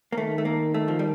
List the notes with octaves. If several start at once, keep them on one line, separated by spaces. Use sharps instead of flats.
A#3
D#3 A3
A3
A#3
A3
F3
G3